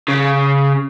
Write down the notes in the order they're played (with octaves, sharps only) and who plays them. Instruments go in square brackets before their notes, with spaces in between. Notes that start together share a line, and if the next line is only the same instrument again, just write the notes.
[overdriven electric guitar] C#3